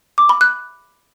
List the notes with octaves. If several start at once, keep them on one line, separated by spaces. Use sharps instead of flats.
D6
B5
F#6